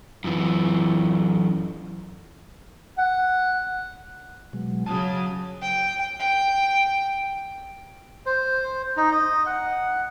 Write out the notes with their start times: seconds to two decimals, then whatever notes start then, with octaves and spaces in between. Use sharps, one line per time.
0.24 F#2 E3
2.98 F#5
4.53 B2 F#3 G#3
4.86 C#3 F#3 A5 D#6
5.62 G5
6.20 G5
8.26 C5
8.97 D#4
9.12 D#5
9.46 F#5